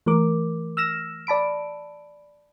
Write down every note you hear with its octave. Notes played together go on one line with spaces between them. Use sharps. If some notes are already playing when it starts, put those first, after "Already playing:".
E3 A3 A#4 D6
E6 F6 A#6 E7
D5 A5 B5 D7